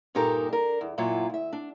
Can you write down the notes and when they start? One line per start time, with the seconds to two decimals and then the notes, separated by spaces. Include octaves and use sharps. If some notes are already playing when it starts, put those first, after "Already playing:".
0.15 G2 A#2 D#4 G4 A4 A#4
0.49 D4 A#4
0.81 E2
0.98 F#2 A#2 F#3 E4 F4
1.29 D2 E5
1.53 D4